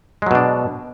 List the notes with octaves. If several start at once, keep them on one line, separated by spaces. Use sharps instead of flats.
B2 F#3 G#3 D4